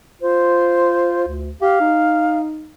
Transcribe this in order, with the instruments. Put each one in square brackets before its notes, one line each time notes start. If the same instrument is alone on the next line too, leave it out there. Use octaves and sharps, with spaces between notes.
[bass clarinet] F4 [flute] C5
[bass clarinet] D2
[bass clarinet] G4 [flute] F5
[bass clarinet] D#4